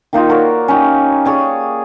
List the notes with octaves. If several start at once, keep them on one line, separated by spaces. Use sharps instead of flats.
D#3 A#3 D#4 F4
F#4 A#4 C#5 D5
C#4 D#4 G4
G#4 C#5 D5